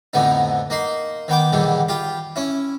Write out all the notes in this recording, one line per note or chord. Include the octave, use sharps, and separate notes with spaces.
F2 A2 D3 B3 D#4
A#3 D#4 C6
D#3 B3 G5 D6
E2 A#2 D3 D#3 G3
F4 G4 B5
C#4 E4